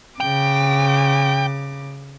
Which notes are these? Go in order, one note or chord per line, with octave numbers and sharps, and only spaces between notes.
C#3 G5 D6